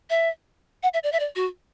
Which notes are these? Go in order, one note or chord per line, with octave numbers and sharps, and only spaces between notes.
E5
F#5
E5
D5
E5
D5
F#4